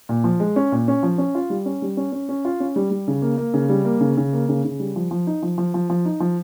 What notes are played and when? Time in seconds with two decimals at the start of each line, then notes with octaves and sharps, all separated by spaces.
0.09 A#2
0.24 F3
0.40 G#3
0.56 C#4
0.72 A#2
0.88 C#4
1.03 F3
1.18 C#4
1.35 F4
1.50 G3
1.66 C#4
1.82 G3
1.97 C#4
2.12 C#4
2.29 C#4
2.45 F4
2.60 C#4
2.76 G3
2.91 G3
3.08 C#3
3.22 A#3
3.38 A#3
3.54 C#3
3.69 G3
3.85 A#3
4.01 C#3
4.17 C#3
4.33 A#3
4.49 C#3
4.64 C#3
4.80 G3
4.96 F3
5.11 F3
5.27 D#4
5.43 F3
5.58 F3
5.74 F3
5.90 F3
6.05 D#4
6.20 F3